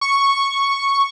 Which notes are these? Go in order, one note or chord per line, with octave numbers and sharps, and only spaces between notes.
C#6